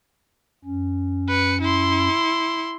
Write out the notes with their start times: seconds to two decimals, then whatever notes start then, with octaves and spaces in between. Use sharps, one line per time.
0.65 F#2 C#4
1.29 B4 C#7
1.61 E4 C6